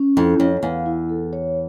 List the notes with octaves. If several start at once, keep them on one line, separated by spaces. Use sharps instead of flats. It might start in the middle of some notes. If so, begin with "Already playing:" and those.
Already playing: C#4
F2 E4
F2 C#5
E2 F5
E4
A4
C#5